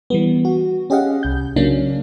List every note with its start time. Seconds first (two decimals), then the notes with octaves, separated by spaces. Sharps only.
0.10 E3 G3 B3
0.45 F#4
0.90 C#4 G4 G#4 D#5 F5 F#5
1.23 C2 G6
1.56 C#3 F#3 A#3 C#4 D4